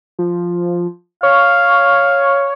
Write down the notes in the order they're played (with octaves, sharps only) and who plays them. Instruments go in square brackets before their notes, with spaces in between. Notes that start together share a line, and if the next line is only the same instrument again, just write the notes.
[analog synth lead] F3
[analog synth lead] C#5 [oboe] F5